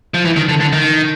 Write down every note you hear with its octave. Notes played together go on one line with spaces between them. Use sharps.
F3
E3
D#3
D3
D3
D#3